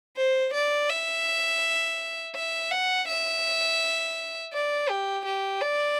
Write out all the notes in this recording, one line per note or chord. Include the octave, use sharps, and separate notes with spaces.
C5
D5
E5
E5
F#5
E5
D5
G4
G4
D5